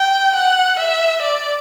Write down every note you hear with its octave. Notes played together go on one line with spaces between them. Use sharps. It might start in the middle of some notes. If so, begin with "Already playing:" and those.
Already playing: G5
F#5
E5
D5